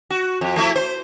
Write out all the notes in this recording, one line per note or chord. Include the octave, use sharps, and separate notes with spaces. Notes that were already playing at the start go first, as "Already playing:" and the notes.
F#4
F2
F3 A3 E4
C5